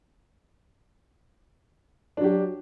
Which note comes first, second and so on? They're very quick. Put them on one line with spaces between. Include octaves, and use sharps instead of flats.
D4 F#3 G4